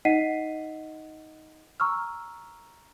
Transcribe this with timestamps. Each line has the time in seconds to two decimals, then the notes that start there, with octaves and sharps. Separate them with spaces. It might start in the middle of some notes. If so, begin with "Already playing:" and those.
0.05 D#4 D#5 F#5 B6 C7 D#7
1.80 A#5 C#6 E6 F6